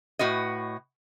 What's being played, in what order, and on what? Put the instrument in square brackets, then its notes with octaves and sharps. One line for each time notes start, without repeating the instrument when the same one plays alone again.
[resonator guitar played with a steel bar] A2 F#4 B4 D#5